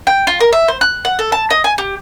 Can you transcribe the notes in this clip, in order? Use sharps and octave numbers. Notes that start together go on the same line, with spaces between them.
G5
F4
A#4
E5
C5
F#6
F#5
A4
A5
D#5
G#5
G4